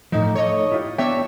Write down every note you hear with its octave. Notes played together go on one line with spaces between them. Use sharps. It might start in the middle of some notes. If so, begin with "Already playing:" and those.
A2 F3 A3 D#4
A3 A4 C#5 D#5
E4 F4 G4
B3 D4 C#5 E5 G5